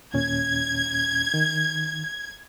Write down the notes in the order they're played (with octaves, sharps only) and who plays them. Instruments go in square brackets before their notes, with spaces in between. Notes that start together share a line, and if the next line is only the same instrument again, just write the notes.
[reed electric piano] D#2 A#2 C#4 [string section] G#6
[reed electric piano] D#3